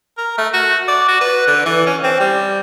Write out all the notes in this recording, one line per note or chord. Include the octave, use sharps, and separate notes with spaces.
A#4
A3
F#4
D5
F#4
B4
D3
E3
C#4
C4
G3